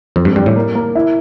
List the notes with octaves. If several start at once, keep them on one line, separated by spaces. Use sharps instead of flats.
F2 C4
G2
G2 G3
A2
A#3
A#3
E4